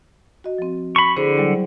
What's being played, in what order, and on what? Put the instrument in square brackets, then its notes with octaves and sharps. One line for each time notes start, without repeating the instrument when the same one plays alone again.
[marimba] F#4 D#5
F3 C4
[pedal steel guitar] B5 C#6
[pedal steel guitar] D3 [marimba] E4 G#4 C5
[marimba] F#3 G3 E4